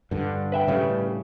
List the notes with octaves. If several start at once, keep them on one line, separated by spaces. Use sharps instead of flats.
G2 D3
B4 E5 G5
A2 C#3 G3